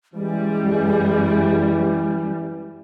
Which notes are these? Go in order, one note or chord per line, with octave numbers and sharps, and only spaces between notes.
F#2 E3 G3 G#3